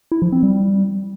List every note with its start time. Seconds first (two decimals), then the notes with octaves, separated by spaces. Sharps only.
0.12 E4
0.22 F3
0.32 C4
0.43 G3